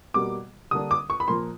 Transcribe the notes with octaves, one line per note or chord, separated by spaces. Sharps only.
B2 G3 A#3 D6
D3 G3 A#3 D4 D#6
D6
C#6
B5
A#2 F3 A#3 C6